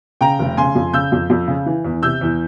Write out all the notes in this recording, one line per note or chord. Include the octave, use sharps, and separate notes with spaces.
C#3 G5 A#5
F1
C#3 G#5 C6
F2
C#3 E6 G6
F2
F2
C#3
E3
E2
C3 E6 G6
E2